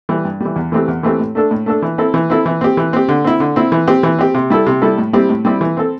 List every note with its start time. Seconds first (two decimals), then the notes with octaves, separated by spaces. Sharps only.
0.09 E3 G3
0.25 G2
0.40 E3 G3
0.56 E2
0.72 E3 A3 C4 G4
0.88 E2
1.03 E3 A3 C4 G4
1.19 A2
1.35 A3 D4 A4
1.51 A2
1.66 A3 D4 A4
1.82 E3
1.98 C4 E4 A4
2.14 E3
2.30 C4 E4 A4
2.46 E3
2.61 C4 G4
2.77 E3
2.93 C4 G4
3.09 D3
3.25 C4 E4
3.40 D3
3.56 C4 E4
3.72 E3
3.88 C4 G4
4.03 E3
4.19 C4 G4
4.34 C3
4.50 G3 E4 A4
4.66 C3
4.82 G3 E4 A4
4.98 A2
5.13 G3 C4 E4 G4
5.29 A2
5.45 G3 C4 E4 G4
5.61 E3
5.77 C4 A4